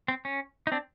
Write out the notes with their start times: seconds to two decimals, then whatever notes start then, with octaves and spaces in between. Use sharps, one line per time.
0.08 C4
0.25 C#4
0.67 D#4
0.72 C4 D4